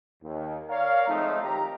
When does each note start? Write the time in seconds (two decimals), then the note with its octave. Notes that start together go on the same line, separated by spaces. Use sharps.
0.23 D#2
0.69 A#4 C#5 D5 F5
1.08 F3 G#3 A3 C4 D#4
1.42 D#2 G4 A#5